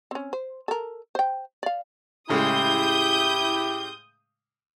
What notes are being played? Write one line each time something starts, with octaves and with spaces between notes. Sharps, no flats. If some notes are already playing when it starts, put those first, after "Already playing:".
C4 C#4
C5
A4 A#4
C5 G5
D5 F5
A2 C#3 G#3 E4 G4 D#6 G6